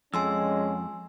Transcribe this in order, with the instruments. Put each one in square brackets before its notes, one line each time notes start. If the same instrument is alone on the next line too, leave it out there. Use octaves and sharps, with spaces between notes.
[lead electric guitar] F2 [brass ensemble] G#3 C#4 [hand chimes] G#5 C6 E6